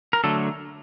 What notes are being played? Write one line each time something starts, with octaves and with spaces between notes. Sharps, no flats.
A#4
D3 F#3 A3 A4